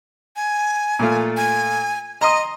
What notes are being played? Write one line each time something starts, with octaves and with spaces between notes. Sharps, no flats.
G#5
A#2 A3 F4
G#5
D#5 A#5 C6 D#6